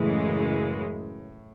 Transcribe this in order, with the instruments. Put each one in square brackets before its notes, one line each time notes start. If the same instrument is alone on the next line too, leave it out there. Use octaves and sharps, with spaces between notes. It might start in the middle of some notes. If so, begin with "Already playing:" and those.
Already playing: [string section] F#2 C#3 E3 G#3 [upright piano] A2